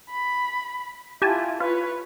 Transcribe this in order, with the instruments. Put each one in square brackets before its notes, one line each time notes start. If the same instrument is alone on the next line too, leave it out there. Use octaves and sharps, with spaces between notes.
[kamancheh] B5
[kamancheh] E4 F4 [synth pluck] G4 G#5 A5
[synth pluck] F4 [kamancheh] B4 C#5